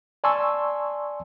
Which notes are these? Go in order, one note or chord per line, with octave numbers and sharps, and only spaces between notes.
D5 G#5 A5 C6 C#6 E6